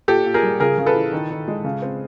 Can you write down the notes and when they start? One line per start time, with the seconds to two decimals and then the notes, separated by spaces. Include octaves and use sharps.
0.08 A#2 G4 A4
0.26 A#2
0.34 G#4 A#4
0.43 G3
0.60 C#3 G#4 A#4
0.78 C#3
0.86 A4 B4
0.95 E3
1.13 D#3
1.30 D#3
1.48 G#3
1.64 C#3
1.82 C4